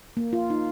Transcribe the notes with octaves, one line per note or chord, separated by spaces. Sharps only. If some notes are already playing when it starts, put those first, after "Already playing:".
A#3
F4
D#4